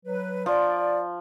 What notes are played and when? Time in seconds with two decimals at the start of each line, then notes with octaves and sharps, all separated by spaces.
0.05 F#3 B4
0.46 F3 D5